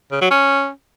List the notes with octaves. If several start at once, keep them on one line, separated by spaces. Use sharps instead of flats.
C#3
F#3
C#4